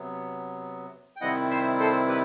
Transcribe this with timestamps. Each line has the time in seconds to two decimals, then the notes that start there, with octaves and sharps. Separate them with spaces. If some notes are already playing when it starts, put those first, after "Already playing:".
Already playing: C3 F#3 B3
1.16 G5
1.21 C3 D#3 G3 C4 E4 D#5 F#5
1.50 C5 E5
1.79 A4 C5
2.08 G4 B4